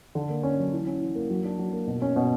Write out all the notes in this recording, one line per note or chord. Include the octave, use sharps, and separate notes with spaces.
D3
A#3
C#4
F#3
E3
C#4
E3
A#3
F#3
D4
F#3
A#3
B2
C#4
B2